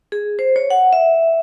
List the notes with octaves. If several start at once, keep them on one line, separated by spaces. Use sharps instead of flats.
G#4
C5
C#5
F#5
E5